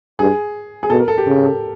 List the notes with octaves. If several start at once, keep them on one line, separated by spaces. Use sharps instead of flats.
G2 G#4
G#4
B2 A4
A#4
A4
G4
C#3
A4